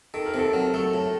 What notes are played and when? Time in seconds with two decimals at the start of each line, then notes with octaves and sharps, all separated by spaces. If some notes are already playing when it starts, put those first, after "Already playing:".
0.14 D#3 A4
0.26 A#4
0.34 C3 A4
0.53 F#3
0.74 A3 A4
0.94 A2